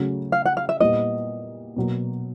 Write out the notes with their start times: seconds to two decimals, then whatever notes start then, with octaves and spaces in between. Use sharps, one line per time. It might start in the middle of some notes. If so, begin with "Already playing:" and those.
Already playing: C#3 F#3 A3 C#4 F#4
0.32 F5
0.45 F#5
0.57 F5
0.69 E5
0.80 A#2 G3 B3 E4 D#5
1.76 B2 F#3 A#3